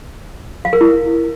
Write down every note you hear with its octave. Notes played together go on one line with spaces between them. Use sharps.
F5
A#4
E4